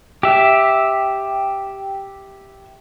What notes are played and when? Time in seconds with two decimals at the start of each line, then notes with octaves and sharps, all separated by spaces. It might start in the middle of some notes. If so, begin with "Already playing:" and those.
0.23 G4 E5